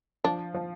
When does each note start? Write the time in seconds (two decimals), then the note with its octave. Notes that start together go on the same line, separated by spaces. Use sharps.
0.24 F3 D4
0.54 F3